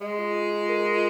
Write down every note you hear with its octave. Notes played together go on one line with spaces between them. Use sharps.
G#3 D#5
F4
F4
F4
A#4
F4